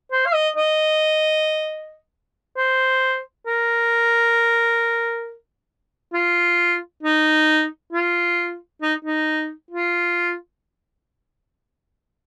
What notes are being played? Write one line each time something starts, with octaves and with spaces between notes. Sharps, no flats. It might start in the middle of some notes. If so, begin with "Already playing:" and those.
C5
F5
D#5
D#5
C5
A#4
F4
D#4
F4
D#4
D#4
F4